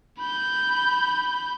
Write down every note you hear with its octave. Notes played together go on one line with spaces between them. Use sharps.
B5 G6